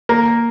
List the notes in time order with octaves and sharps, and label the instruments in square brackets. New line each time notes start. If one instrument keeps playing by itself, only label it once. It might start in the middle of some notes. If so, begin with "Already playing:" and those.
[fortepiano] A#3